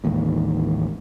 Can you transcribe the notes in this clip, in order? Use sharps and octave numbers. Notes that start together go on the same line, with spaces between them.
A1 D#2 G#2